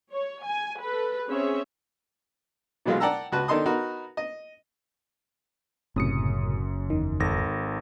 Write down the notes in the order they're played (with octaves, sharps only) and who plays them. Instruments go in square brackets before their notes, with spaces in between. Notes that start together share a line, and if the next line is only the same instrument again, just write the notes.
[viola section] C#5
G#5
A4 B4
C4 C#4 G#4 C#5 E5
[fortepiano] B2 E3 F#3 G#3 A3 F4
D5 F#5 G5 A5 A#5 E6
C#2 F#4 B4 A5
D#3 D4 D#4 A4 C6 D#6
B3 D#4 F#4 A#4
D#5
[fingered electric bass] F#1 [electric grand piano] F#2 C#7 [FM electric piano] A2 C3 D#6
[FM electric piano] E2 D#3
[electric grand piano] G#1 A4 A#6